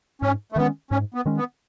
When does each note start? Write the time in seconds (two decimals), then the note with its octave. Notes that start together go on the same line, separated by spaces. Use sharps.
0.22 G#2 C#4
0.52 A3
0.56 D#3 G#3 B3 C#4
0.91 G#2 C#4
1.14 B3
1.25 D#3 G#3 C#4
1.37 B3